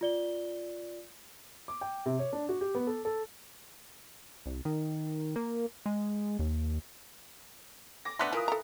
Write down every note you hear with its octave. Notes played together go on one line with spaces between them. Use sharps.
F4 D5 G7
D6
G5
C3
C#5
D4
F#4
G4
B3
A4
A4
C2
D#3
A#3
G#3
D#2
D6 A#6
A3 B3 D4 C6 F#6 B6
E3 F4 A#4 D#6
A4 A#5